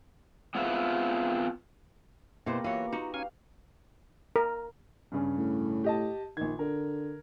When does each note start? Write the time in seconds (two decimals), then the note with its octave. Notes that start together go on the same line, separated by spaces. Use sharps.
0.55 B3 C4 F4 G#4 B4 E5
2.46 B2 A3 A#3 E4 G4 B4 C5
2.64 E3 F#3 F4 C#5
2.92 D#4 F#4 A#5
3.14 C#4 F5 G#5
4.36 A#4
5.12 G2 C#3 C#4
5.38 A2
5.84 G4 D#5 A5
6.37 A#1 D#3 G#6
6.59 D3 A#4